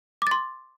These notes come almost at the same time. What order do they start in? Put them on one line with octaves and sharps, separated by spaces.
D6 A6 C6